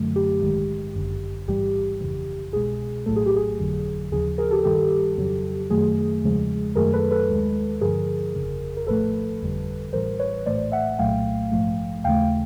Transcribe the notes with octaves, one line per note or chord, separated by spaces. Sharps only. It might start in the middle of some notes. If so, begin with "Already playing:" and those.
Already playing: F#2 D3 F#3 A3
G4
A#1 G#2 D#3 G#3
G1 F#2 D3
A1 G#2 E3 G3 G4
G1 F2 C#3 E3
C2 B2 G#3 G#4
A#1 A2 F#3 A3 A4
G#4
G4
G#4
G1 F2 D3 F#3
D#2 C#3 F3 G#4
G#4 A#4
G4 A4
G2 D#3 G3 G4 A4
F2 C#3 F#3
F#2 D#3 F#3 A3 G#4
E2 C#3 F3 G#3
F#2 D#3 F#3 A3 G#4 A#4
A4 B4
A4 B4
D#2 D#3 G#3
G2 D3 F3 G#4 A#4
G1 F2 C#3
A#4
A#1 A2 F3 A3 A4 B4
G1 F2 D3 G3
A1 A2 E3 G3 A#4 C5
B4 C#5
A#1 A2 E3 A3 C5 D5
E5 F#5
C2 A#2 F#3 A3 F5 G5
A#1 G#2 F3 A3
D#2 C#3 E3 A3 F5 G5